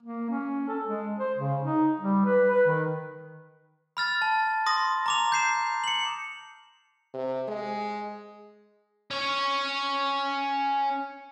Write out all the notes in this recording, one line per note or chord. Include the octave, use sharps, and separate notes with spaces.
A#3
C#4
A4
G#3
C5
C#3
D#4
G3
B4
B4
D#3
B5 F6 A6
A5
C6 D#6 A#6
A#5 D6 F7
G6 C7 E7
C#7 F#7
C3
G#3
C#4 C#5